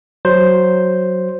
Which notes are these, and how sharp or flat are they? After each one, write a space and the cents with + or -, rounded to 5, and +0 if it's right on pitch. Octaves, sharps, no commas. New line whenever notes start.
F#3 +0 C5 +0